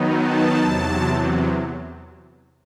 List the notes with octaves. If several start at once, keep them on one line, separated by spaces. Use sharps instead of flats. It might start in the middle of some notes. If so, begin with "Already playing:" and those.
Already playing: D#3 F#3 B3 D#4
A5
E2 C3 F#3